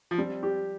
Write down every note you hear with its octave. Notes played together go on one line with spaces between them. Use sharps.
F3
G3 C4
G4